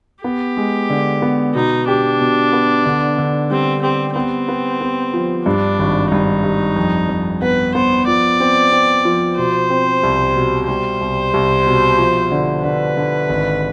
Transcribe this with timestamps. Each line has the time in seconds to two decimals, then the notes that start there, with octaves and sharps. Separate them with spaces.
0.24 B3 G4
0.57 G#3
0.90 D3
1.22 B3
1.54 B2 D#4
1.88 D4 G4
2.20 B2
2.53 B3
2.86 D3
3.18 D3
3.50 G3 C4
3.83 C4 G4
4.15 B3 C4
4.49 B3
4.81 B3
5.13 F3
5.46 G2 D4
5.79 G#1
6.12 G2 D#4
6.44 G2
6.76 F2
7.09 F2
7.42 B3 B4
7.75 B3 C5
8.07 F3 D5
8.40 C4
8.72 C4
9.05 F3
9.37 B2 C5
9.70 C4
10.03 C2
10.35 B2
10.68 G3 C5
11.01 C2
11.34 C2
11.66 B2
11.98 F3
12.32 D3
12.63 D3 B4
12.97 D3
13.30 G#1